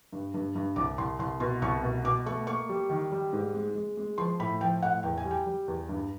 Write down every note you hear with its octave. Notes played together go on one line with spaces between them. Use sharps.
G2
G2
G2
C2 D6
C2 C6
C2 C6
B2 C6
C2 C#6
B2
B2 D6
A3 C#6
A#3 C#6
G3
D#3
G3
G#2
G#3
G#3
G#3
F3 C6
A2 B5
F3 G5
A2 F#5
E2 G5
G#5
G3
G5
G3
E2
G2